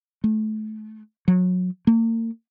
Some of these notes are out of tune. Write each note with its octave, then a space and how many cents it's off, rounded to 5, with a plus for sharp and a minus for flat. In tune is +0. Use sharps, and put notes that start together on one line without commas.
A3 -30
F#3 -25
A#3 -40